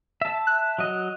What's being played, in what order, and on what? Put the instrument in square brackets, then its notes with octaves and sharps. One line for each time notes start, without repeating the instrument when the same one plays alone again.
[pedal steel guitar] E5 A5
[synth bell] F#6
[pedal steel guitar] F#3 D#5